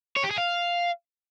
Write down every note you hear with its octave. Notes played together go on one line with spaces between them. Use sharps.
C#5
G4
G#4
F5